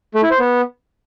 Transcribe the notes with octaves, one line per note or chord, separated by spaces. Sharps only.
A3
E4
C5
B3